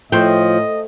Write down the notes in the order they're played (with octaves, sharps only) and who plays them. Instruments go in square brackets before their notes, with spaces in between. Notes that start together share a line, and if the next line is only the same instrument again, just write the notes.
[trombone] A2 [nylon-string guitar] F3 [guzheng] A3 C5 G5 [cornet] D#5